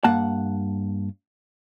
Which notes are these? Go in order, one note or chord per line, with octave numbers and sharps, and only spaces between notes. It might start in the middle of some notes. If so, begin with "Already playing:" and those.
G2 A#3 F#5 A5